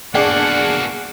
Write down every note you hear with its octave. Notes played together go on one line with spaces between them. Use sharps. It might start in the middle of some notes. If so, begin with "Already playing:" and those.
A#3 B3 D4 F#4 G#4 D5 F#5